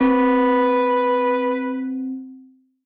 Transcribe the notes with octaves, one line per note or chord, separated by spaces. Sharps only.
C4 B4